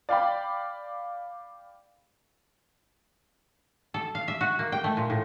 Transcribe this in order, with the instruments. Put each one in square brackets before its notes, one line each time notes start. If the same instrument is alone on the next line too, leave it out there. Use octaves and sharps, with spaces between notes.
[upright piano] D5 F5 G5 B5
[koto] A4
F5
E5
F#4
A#3
G5
A3
A#2
A2